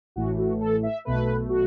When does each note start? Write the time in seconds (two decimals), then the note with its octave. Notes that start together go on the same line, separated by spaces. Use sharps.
0.16 A1 A2 E3 A3 F#4
0.38 F#4
0.60 A4
0.83 E5
1.05 B1 B2 A3 B4
1.49 F#4